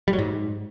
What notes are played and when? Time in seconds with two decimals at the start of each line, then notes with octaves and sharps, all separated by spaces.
0.08 G3
0.13 F#3
0.18 G#2